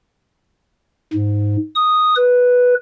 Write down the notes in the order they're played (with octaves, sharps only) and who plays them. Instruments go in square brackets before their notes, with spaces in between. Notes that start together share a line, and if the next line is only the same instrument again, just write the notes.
[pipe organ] G#2
D#6
B4